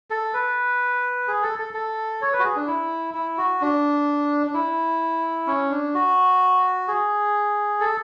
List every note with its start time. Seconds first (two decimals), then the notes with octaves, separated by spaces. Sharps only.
0.10 A4
0.34 B4
1.28 G#4
1.43 A4
1.59 A4
1.74 A4
2.21 C#5
2.33 B4
2.39 F#4
2.44 G#4
2.56 D4
2.67 E4
3.14 E4
3.38 F#4
3.61 D4
4.47 D4
4.54 E4
5.47 C#4
5.70 D4
5.94 F#4
6.88 G#4
7.80 A4